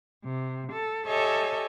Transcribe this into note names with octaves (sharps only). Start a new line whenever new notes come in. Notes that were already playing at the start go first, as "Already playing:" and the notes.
C3
A4
G4 A4 C#5 D#5 E5 G#5